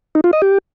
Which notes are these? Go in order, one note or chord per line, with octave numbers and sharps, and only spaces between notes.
D#4
F4
D#5
G4